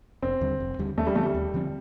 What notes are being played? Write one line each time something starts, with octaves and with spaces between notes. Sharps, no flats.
F1 C4
D#2 D3 G3
F1
D#2 D3 G3
D#2 A3
G3
D3 F3 A3 C4
G3
D#2
D3 F3 C4